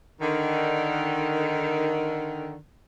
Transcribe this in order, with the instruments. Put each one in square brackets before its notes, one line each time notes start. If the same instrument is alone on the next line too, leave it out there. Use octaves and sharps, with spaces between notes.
[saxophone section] D3 D#3